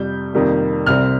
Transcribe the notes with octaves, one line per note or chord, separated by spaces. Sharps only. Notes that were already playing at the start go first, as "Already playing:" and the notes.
Already playing: F2 C3 G3 G6
F2 C3 D#3 G3 A#3
C2 C3 G3 C4 F6